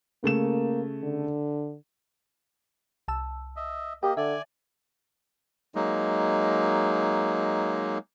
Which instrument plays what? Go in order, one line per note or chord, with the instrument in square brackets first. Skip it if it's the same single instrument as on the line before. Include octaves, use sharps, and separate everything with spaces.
[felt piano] C#3 A3 E7 [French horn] A#3
[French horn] D3
[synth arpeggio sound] C2 A5 E6
[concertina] D#5 E5
[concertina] A#3 D#5 [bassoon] G4 [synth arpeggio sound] G5
[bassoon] D3 [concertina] D5 G#5 [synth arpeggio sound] E5
[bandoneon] F#3 G#3 A#3 D#4